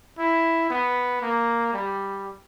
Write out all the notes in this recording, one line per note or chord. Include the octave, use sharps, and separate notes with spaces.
E4
B3
A#3
G3